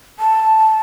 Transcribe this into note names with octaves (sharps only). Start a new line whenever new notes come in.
A5